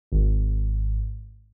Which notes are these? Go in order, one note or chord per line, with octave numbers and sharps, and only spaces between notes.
G#1